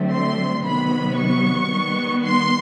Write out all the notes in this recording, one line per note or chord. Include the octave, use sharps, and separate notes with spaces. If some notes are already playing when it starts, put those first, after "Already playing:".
Already playing: D3 F#3 A3 C4
C6
C3 D#3 F#3 B3 B5
C#6
D#3 G3 B3
C6